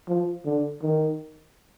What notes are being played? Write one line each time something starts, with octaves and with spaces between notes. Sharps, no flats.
F3
D3
D#3